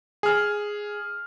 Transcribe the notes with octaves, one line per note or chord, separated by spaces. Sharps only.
G#4 F6